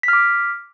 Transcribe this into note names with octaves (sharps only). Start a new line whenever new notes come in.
D6 F6 B6